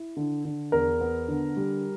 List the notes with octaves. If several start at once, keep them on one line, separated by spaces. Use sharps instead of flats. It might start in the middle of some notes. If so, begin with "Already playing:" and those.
Already playing: E4
D3
D3
E2 A#4
B3
D3
G3